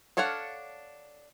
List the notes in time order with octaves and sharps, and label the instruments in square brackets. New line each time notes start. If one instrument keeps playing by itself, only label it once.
[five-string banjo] D4 A4 C#5 F5 F#5